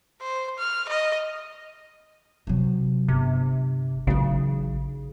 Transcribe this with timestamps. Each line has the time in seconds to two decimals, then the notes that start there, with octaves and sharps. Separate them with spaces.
0.21 C5
0.59 F6
0.89 D#5
2.47 C3 F#3
3.08 G1 C3
4.07 A1 C#3 F#3 D#4